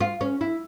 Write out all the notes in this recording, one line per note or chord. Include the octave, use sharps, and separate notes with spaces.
F4
C#4
E4